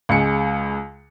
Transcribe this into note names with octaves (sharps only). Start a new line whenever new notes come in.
C#2 G#3 C#7